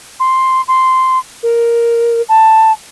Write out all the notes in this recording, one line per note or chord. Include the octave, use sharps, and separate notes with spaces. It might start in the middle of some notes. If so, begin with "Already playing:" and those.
C6
C6
A#4
A5